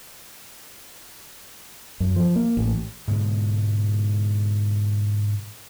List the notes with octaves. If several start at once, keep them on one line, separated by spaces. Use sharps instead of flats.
F#2
F3
A#3
A1
G#2 B2 D3 G#3